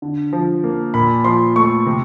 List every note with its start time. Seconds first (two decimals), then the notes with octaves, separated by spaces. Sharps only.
0.02 D3
0.33 F3
0.64 A#3
0.94 A#2 B5
1.24 F3 C6
1.56 A3 C#6
1.86 C3